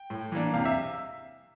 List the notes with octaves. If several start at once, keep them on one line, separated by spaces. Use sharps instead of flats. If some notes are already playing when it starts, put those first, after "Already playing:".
Already playing: G5
A2
E3 A#3 D4
C3 F5
E5